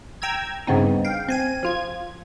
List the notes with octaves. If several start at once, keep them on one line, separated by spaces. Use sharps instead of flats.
G5 A#5 E6 G#6
G2 C#3 B3 C4 D#4
F5 G5
C4 G#5 D#7
F3 F4 G#6